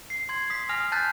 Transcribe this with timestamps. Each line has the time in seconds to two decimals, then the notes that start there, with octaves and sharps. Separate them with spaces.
0.10 C7
0.29 C6 G#6
0.50 D#6 B6
0.69 G#5 D#6 F6 A#6 F7
0.92 A5 F#6 G6 A6 B6